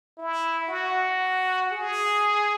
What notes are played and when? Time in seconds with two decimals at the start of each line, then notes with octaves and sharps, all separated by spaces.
0.18 E4
0.68 F#4
1.71 G#4